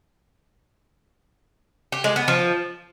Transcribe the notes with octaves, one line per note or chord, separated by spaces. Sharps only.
G4
G#3
B3
F3